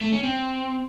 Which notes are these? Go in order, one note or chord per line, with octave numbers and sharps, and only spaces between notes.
A3
C#4
C4